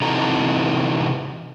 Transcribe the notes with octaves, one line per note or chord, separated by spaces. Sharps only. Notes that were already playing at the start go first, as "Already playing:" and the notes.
C3 E3 D#4 F#4 A4 A#5